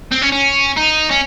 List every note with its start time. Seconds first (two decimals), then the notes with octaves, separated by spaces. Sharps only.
0.12 C4
0.22 C#4
0.32 C#4
0.76 D#4
1.10 C#4